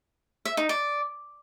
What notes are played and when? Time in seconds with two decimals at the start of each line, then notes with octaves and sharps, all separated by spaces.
0.45 E5
0.57 D#4
0.69 D5